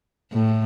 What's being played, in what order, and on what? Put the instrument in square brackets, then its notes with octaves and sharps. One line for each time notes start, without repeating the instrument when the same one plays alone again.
[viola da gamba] A2